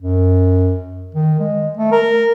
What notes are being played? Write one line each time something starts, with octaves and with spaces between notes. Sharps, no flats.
F#2
D#3
G#3
A3
A#4